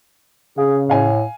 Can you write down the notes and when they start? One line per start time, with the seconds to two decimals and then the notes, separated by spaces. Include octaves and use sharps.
0.58 C#3 G#4 F5
0.89 A2 F5 G#5